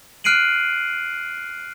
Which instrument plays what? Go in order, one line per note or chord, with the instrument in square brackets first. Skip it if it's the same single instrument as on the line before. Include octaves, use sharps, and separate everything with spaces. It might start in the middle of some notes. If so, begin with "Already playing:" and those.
[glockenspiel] F6 F#6 C7 D7 D#7 F#7